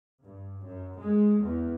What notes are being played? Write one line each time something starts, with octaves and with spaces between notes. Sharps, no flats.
G2
F#2
G#3
E2